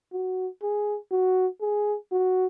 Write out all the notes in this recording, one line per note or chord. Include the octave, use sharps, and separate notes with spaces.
F#4
G#4
F#4
G#4
F#4